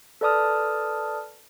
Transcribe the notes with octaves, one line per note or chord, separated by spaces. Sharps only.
A4 B4 D5 A5 D#6 F6